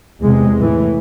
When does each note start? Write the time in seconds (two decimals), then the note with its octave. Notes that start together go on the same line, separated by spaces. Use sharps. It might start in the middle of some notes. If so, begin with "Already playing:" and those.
0.22 E2 C3 G#3
0.58 A2 E3